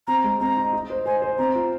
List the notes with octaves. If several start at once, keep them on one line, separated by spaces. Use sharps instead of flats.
C4 A#5
G#3
C4 A#5
D#4
D#4
C5
C5 G#5
C5
C4 A#5
F4